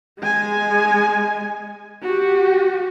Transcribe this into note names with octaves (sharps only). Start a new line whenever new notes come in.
G#3 G#5
F#4 G4